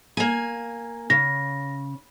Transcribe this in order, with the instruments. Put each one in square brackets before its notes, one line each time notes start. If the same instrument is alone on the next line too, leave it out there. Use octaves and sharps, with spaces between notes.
[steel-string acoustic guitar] A#3 G#5
[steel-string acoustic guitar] C#3 [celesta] A#6